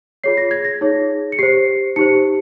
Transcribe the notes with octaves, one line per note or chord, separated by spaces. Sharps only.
F4 G#4 C#5 C7
A#6
G#6
A#6
D#4 G#4 C#5
C#7
G4 C5 C7
D#4 G4 C5 C#7